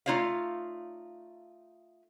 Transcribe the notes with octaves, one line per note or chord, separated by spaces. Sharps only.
A3 D#4 F4 C#5 D5 F5